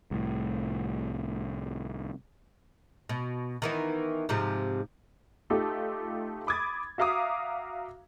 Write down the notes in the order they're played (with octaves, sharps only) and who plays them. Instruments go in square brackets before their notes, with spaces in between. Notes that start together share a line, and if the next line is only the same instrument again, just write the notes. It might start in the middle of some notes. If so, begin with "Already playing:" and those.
[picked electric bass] C2 A2
[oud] B2
D#3 E3 B3
G#2 C3 F3
[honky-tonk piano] A3 D#4 F4 G4 A4
B5 D6 D#6 G#6 A6
F#4 E5 F5 A#5 D6 D#6